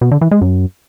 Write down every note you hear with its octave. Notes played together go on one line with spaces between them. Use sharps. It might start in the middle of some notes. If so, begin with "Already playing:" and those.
B2
D3
E3
G#3
F#2